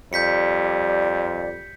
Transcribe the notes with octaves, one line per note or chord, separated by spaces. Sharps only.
F2 G3 D5 G6 B6 C#7